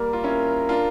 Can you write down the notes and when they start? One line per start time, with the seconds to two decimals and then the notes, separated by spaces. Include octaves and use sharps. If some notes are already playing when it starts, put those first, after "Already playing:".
Already playing: G3 A#3 A#4
0.13 F4
0.24 C#4 E4
0.69 D4 F4